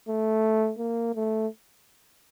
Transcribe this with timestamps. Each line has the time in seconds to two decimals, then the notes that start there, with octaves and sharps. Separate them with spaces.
0.09 A3
0.79 A#3
1.15 A3